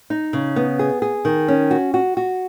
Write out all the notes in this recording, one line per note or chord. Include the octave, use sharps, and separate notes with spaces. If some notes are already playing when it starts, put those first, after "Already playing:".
D#4
C#3
B3
G#4
G#4
D#3
C#4
F#4
F#4
F#4